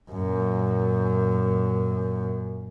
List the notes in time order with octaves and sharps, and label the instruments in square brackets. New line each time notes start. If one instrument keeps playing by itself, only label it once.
[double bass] F#2 A#2